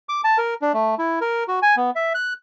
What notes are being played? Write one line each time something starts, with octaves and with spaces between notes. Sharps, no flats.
D6
A5
A#4
D4
A3
E4
A#4
F#4
G#5
B3
E5
F#6